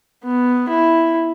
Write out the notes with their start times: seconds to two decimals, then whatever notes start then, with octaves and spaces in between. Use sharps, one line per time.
0.24 B3
0.69 E4